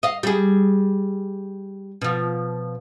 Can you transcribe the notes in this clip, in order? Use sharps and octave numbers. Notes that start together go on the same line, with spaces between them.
D#5 F5
G3 G#4
B2 F3